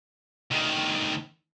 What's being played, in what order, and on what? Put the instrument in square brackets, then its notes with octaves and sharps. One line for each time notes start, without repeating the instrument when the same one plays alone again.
[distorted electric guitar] D2 D#3